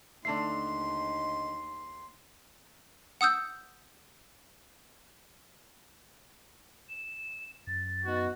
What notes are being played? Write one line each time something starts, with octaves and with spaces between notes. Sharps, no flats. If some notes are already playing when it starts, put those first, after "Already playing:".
D#2 D3 A3 D#4 E5 C6 C7
F#5 D#6 E6 G6
E7
F#2 A6
B3 D#4 F#4